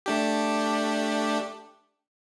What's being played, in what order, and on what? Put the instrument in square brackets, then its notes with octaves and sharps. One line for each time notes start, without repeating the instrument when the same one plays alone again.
[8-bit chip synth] A3 D4 G4